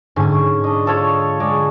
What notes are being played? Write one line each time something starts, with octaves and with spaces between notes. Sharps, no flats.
G#2 D3 C#4 G#5
D4 D#5
F4 A4 C#5
G#3 D5